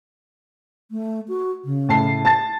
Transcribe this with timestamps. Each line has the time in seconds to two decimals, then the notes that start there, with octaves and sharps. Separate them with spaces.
0.91 A3
1.28 F#4
1.65 C#3
1.89 A2 A5 C7
2.25 A5 A6